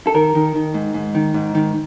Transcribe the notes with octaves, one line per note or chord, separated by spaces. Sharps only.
A4
D#3 A#4
D#3
D#3
G#2
G#2
D#3
G#2
D#3